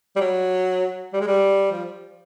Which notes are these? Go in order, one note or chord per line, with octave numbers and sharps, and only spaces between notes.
G3
F#3
G3
G#3
G3
F3